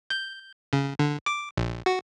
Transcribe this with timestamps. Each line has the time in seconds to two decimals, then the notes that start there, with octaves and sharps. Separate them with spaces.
0.10 G6
0.73 C#3
0.99 D3
1.26 D6
1.57 A#1
1.86 F#4